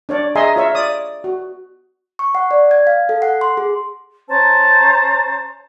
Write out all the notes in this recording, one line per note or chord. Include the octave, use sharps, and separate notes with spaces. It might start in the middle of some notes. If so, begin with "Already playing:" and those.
D4 C#5 D5
G#4 D#5 E5 G#5 A#5 C6
F4 C#5 E5
D5 D#6
F#4
C#6
F#5
D5
G#6
F5
A4
F#5
C6
G#4
C#4 C5 A5 A#5